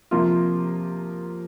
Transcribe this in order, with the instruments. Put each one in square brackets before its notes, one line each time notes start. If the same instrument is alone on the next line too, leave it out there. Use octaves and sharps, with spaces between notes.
[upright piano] C3 F3 A#3 F4